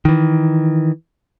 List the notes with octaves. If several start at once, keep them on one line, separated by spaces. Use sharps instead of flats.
D#3 E3